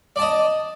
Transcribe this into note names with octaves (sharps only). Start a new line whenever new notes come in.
D5 D#5 A5